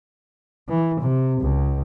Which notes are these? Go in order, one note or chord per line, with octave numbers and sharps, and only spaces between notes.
E3
C3
C#2